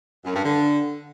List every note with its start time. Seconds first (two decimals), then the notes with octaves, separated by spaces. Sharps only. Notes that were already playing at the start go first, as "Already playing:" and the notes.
0.24 F#2
0.34 G2
0.44 D3